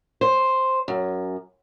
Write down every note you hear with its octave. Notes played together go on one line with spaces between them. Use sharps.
C5
F#2